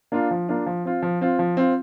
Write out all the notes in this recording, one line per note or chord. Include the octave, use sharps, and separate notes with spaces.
A#3 D4 F4
F3
A#3 D4 F4
F3
C4 F4
F3
C4 F4
F3
C4 F4